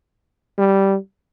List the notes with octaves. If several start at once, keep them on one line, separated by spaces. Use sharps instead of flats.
G3